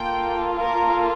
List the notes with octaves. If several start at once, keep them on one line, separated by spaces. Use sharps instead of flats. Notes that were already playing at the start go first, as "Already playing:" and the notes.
Already playing: A#3 F4 A4 G5
A#4